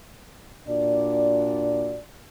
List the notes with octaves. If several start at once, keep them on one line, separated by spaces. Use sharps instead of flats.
A#2 D4 F#4 D5